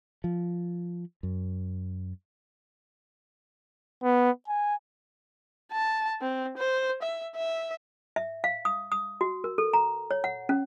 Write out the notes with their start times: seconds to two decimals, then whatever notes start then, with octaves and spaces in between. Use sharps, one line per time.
0.24 F3
1.23 F#2
4.03 B3
4.48 G#5
5.72 A5
6.21 C4
6.58 C5
7.02 E5
7.36 E5
8.16 E5
8.44 F5
8.65 D#6
8.92 D#6
9.21 F#4
9.44 A#4
9.58 A4
9.73 A#5
10.11 C#5
10.24 F#5
10.49 C#4